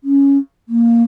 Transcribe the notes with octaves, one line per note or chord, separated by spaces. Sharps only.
C#4
A#3